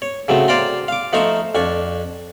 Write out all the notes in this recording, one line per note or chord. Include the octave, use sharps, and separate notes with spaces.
C#5
C#3 F#3 A3 C4
C5 D5 F5 G5 A#5 C6
F5 D6
F3 A3 D#4 C5 A#5 C#6
F2 D4 C#6